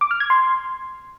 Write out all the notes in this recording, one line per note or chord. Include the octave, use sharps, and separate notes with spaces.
D6
F6
G#6
C6